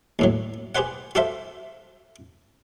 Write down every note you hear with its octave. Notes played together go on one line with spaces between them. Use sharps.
D#2 A2 F#3
G4 G#4 B4 C5 F#5
F#4 G4 A4 C5 E5 F5